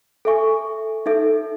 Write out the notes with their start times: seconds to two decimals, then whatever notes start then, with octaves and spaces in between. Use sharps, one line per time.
0.25 A4 E5 G#5 C#6
1.06 D#4 A4 E5